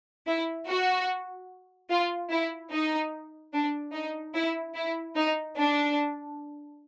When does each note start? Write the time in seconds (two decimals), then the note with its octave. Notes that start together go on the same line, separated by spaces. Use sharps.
0.28 E4
0.68 F#4
1.90 F4
2.31 E4
2.72 D#4
3.53 D4
3.93 D#4
4.34 E4
4.76 E4
5.16 D#4
5.57 D4